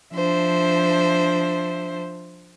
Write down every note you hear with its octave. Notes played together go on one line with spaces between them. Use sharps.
F3 D4 C5 E5